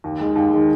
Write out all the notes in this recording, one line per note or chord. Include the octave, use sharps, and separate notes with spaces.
D#2
D#3 G#3
D#2
D#3 G#3